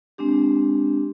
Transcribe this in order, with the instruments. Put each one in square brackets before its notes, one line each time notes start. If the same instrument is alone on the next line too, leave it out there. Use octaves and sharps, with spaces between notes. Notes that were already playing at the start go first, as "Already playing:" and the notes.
[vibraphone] G#3 C4 D4 G4